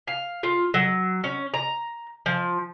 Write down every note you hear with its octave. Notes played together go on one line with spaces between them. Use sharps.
F5
F4
F#3
C#4
A#5
F3